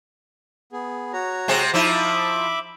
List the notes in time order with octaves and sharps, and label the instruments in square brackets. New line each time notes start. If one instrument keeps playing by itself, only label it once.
[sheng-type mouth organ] B3 G#4
F#4 C#5 A#5
[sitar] C3 G#3 C4
[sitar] F3 D#4 E4 [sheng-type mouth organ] E5 B5 D6